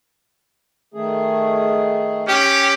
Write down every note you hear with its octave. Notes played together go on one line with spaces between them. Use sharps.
D#3 A3 G#4
C#4 G4